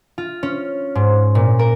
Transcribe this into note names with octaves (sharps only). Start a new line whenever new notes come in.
F4
C#4
G#2
A#2
A#4